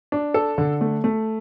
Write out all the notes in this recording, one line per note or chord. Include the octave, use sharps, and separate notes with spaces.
D4
A4
D3
A3
A3